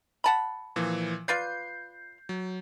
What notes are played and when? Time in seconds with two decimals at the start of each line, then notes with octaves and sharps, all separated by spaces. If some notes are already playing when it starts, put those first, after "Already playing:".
0.24 F#5 A5 B5
0.76 A#2 E3 F3
1.28 F4 B4 D5 G6 C7
2.29 F#3